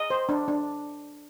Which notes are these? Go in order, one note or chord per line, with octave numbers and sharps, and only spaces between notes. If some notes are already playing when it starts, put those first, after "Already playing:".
Already playing: D#5
C5
D4
D4